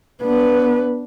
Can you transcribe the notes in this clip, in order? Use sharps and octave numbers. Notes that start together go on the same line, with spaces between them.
B3 D4 B4